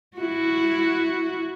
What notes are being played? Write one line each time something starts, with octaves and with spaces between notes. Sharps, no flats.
E4 F#4